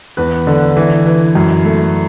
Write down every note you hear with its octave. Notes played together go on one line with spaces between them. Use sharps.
E2 B4
D3
E3
E3
F#2
A3